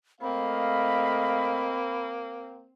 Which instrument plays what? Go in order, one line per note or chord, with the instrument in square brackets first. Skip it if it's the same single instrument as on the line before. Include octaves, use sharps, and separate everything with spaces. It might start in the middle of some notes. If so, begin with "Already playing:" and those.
[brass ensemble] A3 D#5 F5 [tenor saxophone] A#3 [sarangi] C4 [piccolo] B5